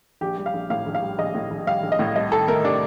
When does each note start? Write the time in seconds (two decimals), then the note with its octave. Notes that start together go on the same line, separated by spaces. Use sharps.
0.21 A#1 G4
0.38 G3
0.46 F5
0.54 A#1
0.70 A2 F5
0.86 A#1
0.95 F5
1.03 G3
1.19 A#1 D#5
1.35 A2
1.51 A#1
1.67 G3 F5
1.83 A#1
1.92 D#5
1.99 A2
2.16 C2 D#5
2.32 D#3 A4
2.48 A3 A#4
2.64 C3 D4